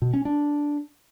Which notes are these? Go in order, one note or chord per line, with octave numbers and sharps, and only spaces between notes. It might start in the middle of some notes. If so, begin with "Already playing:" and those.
B2
C#4
D4